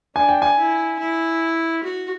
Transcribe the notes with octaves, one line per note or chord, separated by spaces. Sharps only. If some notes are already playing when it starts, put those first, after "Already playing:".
D4 G#5
G5
G#5
E4
E4
F#4